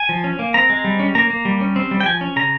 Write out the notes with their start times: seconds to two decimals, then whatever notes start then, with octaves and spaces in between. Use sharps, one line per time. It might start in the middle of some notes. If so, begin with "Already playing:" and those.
Already playing: G#5
0.09 F3
0.24 C#4
0.39 A#3
0.54 C4 A#5
0.70 G#3
0.84 G3
0.99 C#4
1.15 A#3 A#5
1.30 A#3
1.45 G3
1.61 C#4
1.76 C4
1.91 G3
2.00 G5
2.06 F3 G#5
2.21 C#4
2.36 C#3 A#5